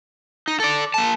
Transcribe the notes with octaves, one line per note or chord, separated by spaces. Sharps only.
D#4
A4 D5
A#3 A5